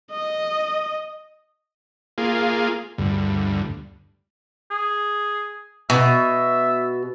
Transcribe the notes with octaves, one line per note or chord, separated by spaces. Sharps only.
D#5
A#3 F4 G#4
D2 G2
G#4
B2 E5